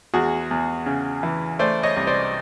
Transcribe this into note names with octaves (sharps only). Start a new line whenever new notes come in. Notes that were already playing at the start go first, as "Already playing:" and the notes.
E2 F#4 G#4
E2
C#3
E3
A3 C5 D5
C#5 D#5
C2
C5 D5